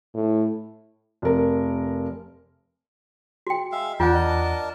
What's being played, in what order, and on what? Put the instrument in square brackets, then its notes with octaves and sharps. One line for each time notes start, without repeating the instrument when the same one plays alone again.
[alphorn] A2
[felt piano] F1 A#4
[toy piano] F#4 G5
[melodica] G#3 E5 F5
[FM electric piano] E2 F#5 [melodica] D4 A#4 A5 [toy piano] F4 [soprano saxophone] G5
[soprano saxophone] D#5